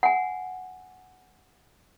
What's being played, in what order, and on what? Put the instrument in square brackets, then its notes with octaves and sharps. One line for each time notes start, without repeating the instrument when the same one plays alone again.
[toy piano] F#5 G#5